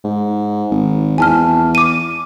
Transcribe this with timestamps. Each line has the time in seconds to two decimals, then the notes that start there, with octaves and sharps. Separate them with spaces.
0.04 G#2
0.71 G#1
1.18 E2 G#5 A5 F6
1.75 D6 D#7